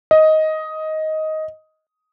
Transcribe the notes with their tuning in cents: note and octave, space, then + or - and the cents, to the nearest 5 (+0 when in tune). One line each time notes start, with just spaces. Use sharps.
D#5 +10